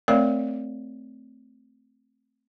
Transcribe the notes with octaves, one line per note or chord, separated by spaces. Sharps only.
A3 C4 A#4 C#5 D5 F5